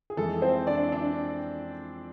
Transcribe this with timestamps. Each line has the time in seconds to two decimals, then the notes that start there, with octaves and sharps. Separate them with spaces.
0.10 G#4
0.17 F2 E3 G#3 A4
0.42 C4 C5
0.67 D4 D5
0.92 D4 D5